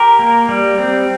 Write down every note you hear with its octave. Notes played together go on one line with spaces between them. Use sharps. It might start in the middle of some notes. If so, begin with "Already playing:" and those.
Already playing: G4 A#4
A#3
G3
C4